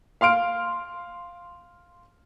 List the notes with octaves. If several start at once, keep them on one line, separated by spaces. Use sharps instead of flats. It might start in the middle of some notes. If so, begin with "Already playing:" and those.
F5 C6 F6 D7